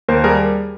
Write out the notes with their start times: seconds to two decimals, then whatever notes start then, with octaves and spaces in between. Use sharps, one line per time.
0.08 D#2 A#4 C5
0.24 G3 G#4 A#4